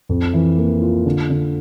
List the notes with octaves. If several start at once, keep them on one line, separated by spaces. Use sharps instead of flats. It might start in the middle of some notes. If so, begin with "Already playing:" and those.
F2
E3
A#3
F4
D3
D3